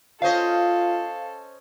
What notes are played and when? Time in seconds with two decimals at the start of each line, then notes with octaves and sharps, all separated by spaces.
0.22 C#4 F4 A4 C5 D#5 F5